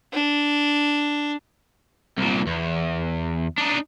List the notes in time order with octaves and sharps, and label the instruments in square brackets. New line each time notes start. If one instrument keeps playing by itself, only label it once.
[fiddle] D4
[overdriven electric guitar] C2 A#2
E2
D4 D#4